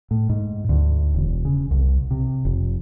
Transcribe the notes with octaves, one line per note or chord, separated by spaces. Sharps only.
A2
G#2
D2
E1
C#3
C2
C3
F1